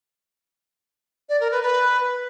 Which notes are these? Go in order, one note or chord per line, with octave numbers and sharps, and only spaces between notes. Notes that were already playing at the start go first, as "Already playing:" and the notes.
D5
A#4
B4
B4